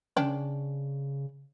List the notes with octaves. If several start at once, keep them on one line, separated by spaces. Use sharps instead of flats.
C#3 C#4 D4 G5